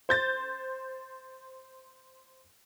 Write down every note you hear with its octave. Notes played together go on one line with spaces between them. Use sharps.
C5 G6 A6